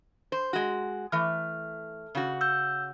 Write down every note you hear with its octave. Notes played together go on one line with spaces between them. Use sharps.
C5
G#3 F#4
E3 A3 F6
C#3 F#4
E6 G6